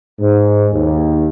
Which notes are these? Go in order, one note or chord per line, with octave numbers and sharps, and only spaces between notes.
G#2
D#2